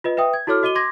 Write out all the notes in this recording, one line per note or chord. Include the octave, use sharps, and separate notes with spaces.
F4 B4 D#5
B4 E5 G5 D#6
G#6
E4 F#4 A4 C#5 D6 F6
F#4 D#5 D6 D#7 G7
C6 D6 G#6 A#6